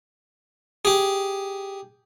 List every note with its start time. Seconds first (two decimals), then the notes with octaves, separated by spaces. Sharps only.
0.85 G4 G#4